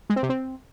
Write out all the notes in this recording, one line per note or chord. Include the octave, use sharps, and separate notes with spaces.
G#3
C4
C3
C4